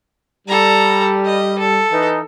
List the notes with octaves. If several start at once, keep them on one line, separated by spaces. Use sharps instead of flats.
G3 A4 A#5
D#5
A4
E3 D#4